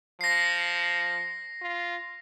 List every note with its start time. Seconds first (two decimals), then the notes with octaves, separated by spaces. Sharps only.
0.21 F3 A#6 C7
1.62 F4